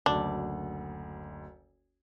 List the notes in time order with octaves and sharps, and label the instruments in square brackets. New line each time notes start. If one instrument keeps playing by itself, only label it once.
[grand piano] F#1 D2 [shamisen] D4